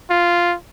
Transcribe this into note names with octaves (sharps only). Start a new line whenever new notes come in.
F4